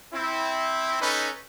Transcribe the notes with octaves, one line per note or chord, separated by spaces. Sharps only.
C4 E4
C#4 D#4 A4 B4 B5